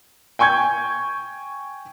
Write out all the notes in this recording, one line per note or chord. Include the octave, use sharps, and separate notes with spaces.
G5 G#5 C#6 G6 G#6